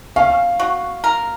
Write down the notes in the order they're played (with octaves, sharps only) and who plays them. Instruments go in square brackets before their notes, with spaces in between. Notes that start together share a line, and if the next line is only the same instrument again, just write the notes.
[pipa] C#4 [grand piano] F5
[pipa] F#4
A#4